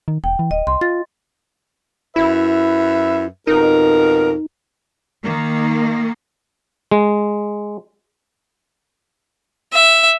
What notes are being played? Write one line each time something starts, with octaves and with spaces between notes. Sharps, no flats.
D#3
E1 G5
E3
D1 D#5
C2 C6
F4 A6
F#2 E4 B4 E5
F2 B2 D#4 A#4
D#3 A#3
G#3
E5